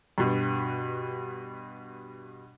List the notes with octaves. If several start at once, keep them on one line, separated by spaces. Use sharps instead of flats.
G2 B2